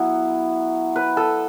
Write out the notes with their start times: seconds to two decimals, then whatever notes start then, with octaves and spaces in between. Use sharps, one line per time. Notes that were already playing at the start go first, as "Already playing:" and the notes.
Already playing: F#3 B3 E4
0.96 B4
1.17 A4